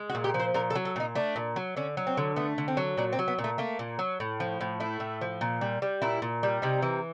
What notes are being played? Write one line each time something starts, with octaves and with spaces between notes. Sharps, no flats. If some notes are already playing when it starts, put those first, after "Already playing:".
Already playing: G#3
F#4
A#2
G4
F3
C5
A#2 A#4
A4
F#3
A4
A#2 D#4
A3 D4
A#2
F#3
D3 C#4
F#3
C4
D3
A3 B3
D3
C4
F#3
A#2 D4
C4
F#3
B3
A#2
A3
A3 A#3
A#2
F#3
A2
F3
A2
A3 E4
A2
F3
A#2
G3
G3
A#2 E4
A#2
G3
C3 D#4
E3